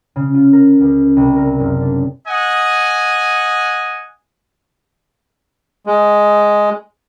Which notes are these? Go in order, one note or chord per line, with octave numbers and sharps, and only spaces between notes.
C#3
F4
A#4
C#2
C2
A#4
F#1
D4
D#5 F#5 G#5
G#3